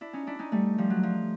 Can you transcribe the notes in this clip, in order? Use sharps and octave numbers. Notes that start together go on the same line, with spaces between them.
D4 E4
C#4 D#4
D4 E4
C#4 D#4
G3 A3
F3 G3
F#3
F3